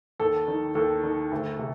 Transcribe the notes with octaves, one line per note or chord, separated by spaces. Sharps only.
D#2 A4
D#3
D#2 A4
D#3
D2
C3